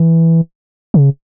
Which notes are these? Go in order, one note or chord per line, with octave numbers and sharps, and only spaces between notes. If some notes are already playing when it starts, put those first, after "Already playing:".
Already playing: E3
C#3